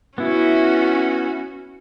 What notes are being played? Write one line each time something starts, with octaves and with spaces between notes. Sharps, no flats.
B3 C#4 E4 F#4